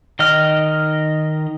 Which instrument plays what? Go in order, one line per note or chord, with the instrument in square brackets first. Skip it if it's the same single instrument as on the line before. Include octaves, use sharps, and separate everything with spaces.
[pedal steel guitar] D#3 D#5 F6